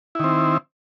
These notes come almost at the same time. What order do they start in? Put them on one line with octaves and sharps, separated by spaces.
E4 D#3 C4